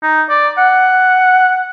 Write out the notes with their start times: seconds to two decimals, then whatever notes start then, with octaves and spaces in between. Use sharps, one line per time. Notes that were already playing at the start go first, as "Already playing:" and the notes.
0.03 D#4
0.30 D5
0.58 F#5